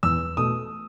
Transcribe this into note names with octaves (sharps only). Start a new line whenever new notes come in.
E2 E6
B2 A3 D#6